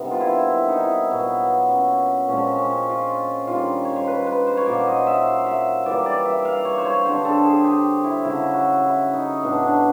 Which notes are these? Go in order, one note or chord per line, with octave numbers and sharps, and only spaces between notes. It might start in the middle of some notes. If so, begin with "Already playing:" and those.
Already playing: C3 D#3 G3 B3 A4
F4
E4
E4
D#4
E4
A#2 F#3 B3
C#4
A#2 F3 G#3 C4 C#4
C#4
F4
D#3 G3 A#3 F4
C#5
C5
B4
B4
C5
C#5
A#2 F#3 A#3 D5
D#5
E5
F5
E5
E3 G3 A#3 D5
D5
E5
F5
C#5
C5
C#5
D3 G3 C4 C5
A4
G#4
G4
E4
C#3 F#3 A3 E4
F#4
E4
D#4
A2 F#3 B3 D4
D4